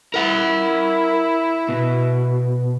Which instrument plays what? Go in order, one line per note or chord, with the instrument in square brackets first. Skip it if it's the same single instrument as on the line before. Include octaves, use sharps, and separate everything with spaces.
[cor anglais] E4 [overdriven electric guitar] A#4 F#5
[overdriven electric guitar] B2